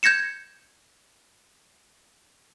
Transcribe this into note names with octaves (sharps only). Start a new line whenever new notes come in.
G6 G#6 A#6 C#7 E7